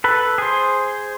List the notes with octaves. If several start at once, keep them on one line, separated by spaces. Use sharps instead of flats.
A4 B4
G#4 C5